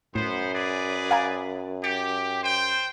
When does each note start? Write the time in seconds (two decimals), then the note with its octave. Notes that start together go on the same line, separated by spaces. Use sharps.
0.15 F#2 A2 B3 C5
0.55 G#4 B4 D5
1.11 F5 G#5 A#5
1.84 G4 A6 C#7
2.43 C5 G5